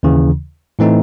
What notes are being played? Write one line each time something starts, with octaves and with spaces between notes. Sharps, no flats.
D#2 C#3 E3
A2 E3 A3 C4 D#4